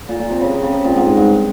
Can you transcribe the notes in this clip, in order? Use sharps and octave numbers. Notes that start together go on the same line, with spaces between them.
A#2
A#2
C3
C#3
C3
C#3
C3
A#2
G#2
G#2
G2